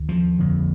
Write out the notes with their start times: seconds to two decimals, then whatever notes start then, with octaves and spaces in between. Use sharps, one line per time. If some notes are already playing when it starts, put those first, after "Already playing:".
Already playing: D#2
0.09 F3
0.39 F2 D3